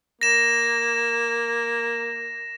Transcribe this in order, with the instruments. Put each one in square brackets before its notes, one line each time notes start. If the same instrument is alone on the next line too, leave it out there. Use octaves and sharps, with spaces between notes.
[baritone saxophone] A#3 [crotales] A#6 E7